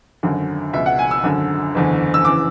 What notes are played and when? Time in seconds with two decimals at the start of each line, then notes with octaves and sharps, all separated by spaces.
0.23 G#1 F#2 D3
0.73 C#2 B2 E5
0.86 F#5
0.99 G#5
1.11 E6
1.24 G#1 F#2 D3
1.75 F#1 E2 D3
2.14 E6
2.25 C#3 E3 D6